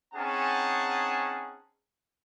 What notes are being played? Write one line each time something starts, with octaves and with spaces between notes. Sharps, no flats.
C4 C#4 D#4 G#4 F#5 A5